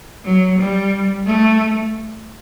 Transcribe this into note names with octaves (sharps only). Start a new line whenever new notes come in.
F#3
G3
A3